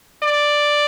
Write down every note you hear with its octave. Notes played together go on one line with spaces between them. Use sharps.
D5